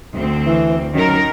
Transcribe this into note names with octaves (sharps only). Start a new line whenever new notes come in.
D2 C4
E3
F#2 D#3 A#4